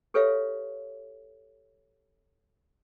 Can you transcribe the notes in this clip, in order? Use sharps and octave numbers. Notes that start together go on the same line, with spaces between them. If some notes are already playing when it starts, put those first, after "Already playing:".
G4 A4 B4 C#5 E5 F5